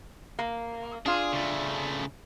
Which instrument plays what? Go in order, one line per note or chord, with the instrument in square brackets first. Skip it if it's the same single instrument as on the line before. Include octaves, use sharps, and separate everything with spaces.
[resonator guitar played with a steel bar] A#3
[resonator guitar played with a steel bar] D4 F4 [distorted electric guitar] G#4
[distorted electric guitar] C#3 A3